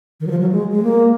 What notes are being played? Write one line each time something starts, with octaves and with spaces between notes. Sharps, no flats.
D#3
F#3
F3
F#3
G#3
G#3
A#3